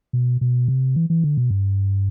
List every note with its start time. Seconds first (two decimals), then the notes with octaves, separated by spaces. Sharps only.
0.13 B2
0.41 B2
0.68 C3
0.96 E3
1.10 E3
1.24 D3
1.37 B2
1.50 G2